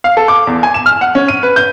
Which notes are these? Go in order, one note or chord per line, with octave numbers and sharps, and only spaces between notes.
F5
A4
D6
E2
G#5
E7
F6
F#5
C#4
D#7
B4
G6